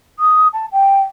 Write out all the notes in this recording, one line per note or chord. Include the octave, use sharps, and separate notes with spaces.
D#6
A5
G5